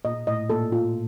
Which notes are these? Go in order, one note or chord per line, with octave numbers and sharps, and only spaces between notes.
A#2 D#5
A2 D#5
A#2 A4
F4